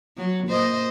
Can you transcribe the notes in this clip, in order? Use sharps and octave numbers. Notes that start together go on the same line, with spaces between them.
F#3
A#2 C5 D#5